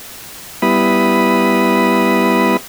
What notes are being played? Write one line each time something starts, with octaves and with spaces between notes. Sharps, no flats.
G3 B3 E4 B5 D#6